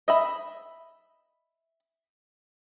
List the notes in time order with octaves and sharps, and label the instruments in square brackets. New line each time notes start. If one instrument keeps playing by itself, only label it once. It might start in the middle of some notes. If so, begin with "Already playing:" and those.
[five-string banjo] D#5 E5 B5